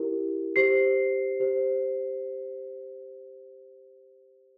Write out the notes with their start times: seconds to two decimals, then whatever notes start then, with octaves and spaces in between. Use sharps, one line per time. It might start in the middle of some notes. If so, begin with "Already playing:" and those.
Already playing: E4 G4 A#4
0.56 G4 C5 C7
1.40 G4 C5